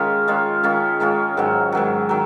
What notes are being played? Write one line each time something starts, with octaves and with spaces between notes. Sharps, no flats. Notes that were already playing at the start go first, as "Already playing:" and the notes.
Already playing: D#3 G#3 C#4 F4
D#3 G#3 C#4 F4
D#3 G#3 C#4 F4
D#3 G#3 C#4 F4
G#2 D#3 F#3
G#2 D#3 F#3
D#3 F#3